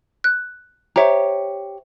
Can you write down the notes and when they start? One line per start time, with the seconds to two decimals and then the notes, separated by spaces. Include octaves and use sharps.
0.24 F#6
0.96 G4 C5 C#5 E5 A#5